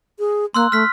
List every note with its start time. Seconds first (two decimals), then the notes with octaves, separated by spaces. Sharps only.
0.19 G#4
0.54 A#3 C6 E6 F#6
0.72 A3 F6 B6